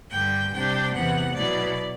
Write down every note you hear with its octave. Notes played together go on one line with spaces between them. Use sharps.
G2 D3 G3 G5
C3 G3 D4 G5
E2 C3 E3 B3 F#5
B2 F#3 B3 E4 D5